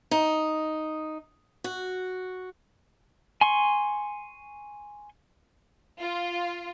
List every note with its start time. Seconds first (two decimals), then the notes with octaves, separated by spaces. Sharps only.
0.11 D#4
1.64 F#4
3.41 G#5 C6 C#6
6.00 F4